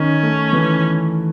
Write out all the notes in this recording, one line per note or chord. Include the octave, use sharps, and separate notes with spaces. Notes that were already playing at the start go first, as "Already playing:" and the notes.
Already playing: D#3 C#4
A3
E3